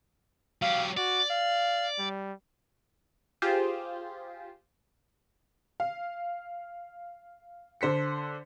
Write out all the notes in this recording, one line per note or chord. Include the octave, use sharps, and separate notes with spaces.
F#3 G4 F5
F#4 D5
F5
G3
F4 G4 G#4 C5
F5
D3 C5 B6 C#7